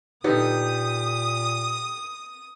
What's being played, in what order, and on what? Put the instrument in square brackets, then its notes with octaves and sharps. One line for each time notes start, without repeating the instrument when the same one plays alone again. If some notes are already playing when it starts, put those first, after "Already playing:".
[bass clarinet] A#2 [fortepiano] D3 B3 D#4 [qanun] G4 [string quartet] D#6